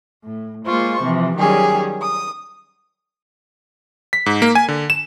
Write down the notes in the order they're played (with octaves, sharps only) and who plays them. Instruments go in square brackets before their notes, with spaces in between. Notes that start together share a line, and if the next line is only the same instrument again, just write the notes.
[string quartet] A2
G#3 A#3 F4 C5 C#6
C3 E3 F3
D#3 F#3 G3 C#4 G4 G#4
D#6
[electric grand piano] B6
G#2
A#3
G#5
D3
E7